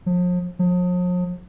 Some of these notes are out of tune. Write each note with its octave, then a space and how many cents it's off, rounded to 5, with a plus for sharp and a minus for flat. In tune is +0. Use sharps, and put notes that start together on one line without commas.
F3 +40
F3 +45